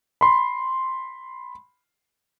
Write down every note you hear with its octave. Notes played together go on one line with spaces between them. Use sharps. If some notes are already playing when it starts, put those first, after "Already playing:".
B5 C6